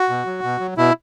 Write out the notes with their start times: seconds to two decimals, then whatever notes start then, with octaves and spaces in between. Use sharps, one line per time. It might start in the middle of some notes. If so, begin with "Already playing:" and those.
Already playing: F#4
0.09 B2
0.26 F#3
0.43 B2
0.60 F#3
0.77 B2 E4